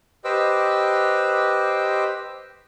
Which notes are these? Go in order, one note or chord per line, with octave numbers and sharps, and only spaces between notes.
G4 B4 C5 D#5 D6 E6